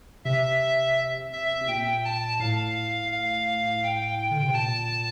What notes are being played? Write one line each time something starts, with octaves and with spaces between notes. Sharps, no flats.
C3 E5
E5
C3
A#2 G5
A5
A2 F5
F5
G5
G5
D3
C3
A#2 A5